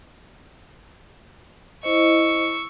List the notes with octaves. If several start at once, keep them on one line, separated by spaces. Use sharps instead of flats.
E4 C5 D#5 C#6 E6